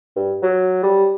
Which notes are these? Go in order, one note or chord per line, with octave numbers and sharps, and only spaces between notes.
G2
F#3
G3